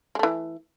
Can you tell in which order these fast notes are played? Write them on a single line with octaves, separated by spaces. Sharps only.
G#3 A3 E3